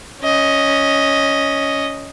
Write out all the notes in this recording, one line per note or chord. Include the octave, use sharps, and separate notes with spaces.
C#4 D#5